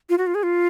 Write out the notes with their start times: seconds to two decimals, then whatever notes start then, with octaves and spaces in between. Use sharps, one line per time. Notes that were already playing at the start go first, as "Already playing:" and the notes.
0.09 F4
0.18 F#4
0.27 F4
0.35 G#4
0.43 F4